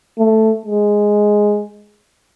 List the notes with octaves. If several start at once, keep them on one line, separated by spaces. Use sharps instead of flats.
A3
G#3